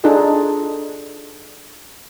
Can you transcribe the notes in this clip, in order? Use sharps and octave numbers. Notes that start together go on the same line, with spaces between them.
D4 D#4 F4 G#4 A4 D#5